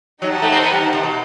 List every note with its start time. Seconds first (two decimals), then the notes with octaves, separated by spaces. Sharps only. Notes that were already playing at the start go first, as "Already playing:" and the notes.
0.22 F#3 D#4 G4 C5 F#5 A5
0.42 A3
0.52 C4
0.63 B3
0.72 G3
0.83 D#3
0.93 C3
1.03 B2